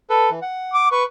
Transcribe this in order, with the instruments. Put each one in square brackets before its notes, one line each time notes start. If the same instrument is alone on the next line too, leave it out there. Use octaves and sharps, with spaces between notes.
[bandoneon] A4 B4
E3
F#5
[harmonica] D6
[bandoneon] B4 [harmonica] C#6